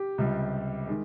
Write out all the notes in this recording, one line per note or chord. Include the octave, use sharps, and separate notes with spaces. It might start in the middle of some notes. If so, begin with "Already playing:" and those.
Already playing: G4
C#2 C3 G3
D#3 G#3